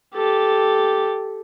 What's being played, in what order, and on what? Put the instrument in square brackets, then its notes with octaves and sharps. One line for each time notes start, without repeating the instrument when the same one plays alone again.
[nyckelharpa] G4 A4